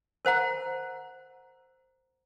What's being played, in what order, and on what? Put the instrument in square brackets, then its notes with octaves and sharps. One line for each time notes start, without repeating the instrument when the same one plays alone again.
[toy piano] A#4 C5 F#5 A#5